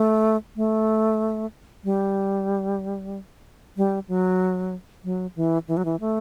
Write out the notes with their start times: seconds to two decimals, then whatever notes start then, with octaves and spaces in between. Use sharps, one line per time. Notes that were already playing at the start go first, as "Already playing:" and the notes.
Already playing: A3
0.56 A3
1.84 G3
3.77 G3
4.08 F#3
5.04 F#3
5.36 E3
5.68 E3
5.77 F#3
5.85 E3
6.00 A3